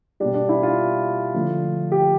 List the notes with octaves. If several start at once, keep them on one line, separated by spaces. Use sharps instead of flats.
B2 G3 D4
D4
E4
F4
D3 F3 A3
G4